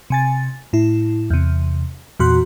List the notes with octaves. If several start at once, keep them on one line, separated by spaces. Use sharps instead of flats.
C3 G#5 A6
A2 E4
E2 C3
E2 A#2 F#4 C6 F#6